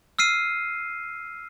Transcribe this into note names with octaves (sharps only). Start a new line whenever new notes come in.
E6 F6 C7 D#7